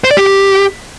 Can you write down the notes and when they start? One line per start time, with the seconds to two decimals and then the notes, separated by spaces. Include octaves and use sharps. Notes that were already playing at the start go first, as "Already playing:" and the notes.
0.04 C5
0.11 D5
0.17 G4